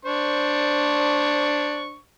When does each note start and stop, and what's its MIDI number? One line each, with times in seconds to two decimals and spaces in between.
0.05 1.97 62
0.05 1.97 72
0.05 1.97 85